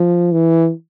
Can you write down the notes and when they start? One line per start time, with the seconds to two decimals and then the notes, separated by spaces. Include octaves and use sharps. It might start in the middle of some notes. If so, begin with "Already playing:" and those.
Already playing: F3
0.32 E3